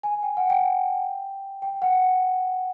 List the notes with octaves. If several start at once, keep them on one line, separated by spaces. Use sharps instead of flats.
G#5
G5
F#5
G5
G5
F#5